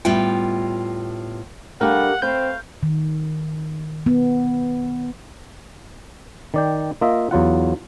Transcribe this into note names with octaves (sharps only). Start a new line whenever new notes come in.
A2 G3 B3 F4 G5
G3 A3 D4 G4 A#4 F5 F#5
A3 C4 B4 F5 G6
D#3
B3
D#3 D5 G5
A#3 F4 D#5 E5 A#5
E2 F#3 F4 F#5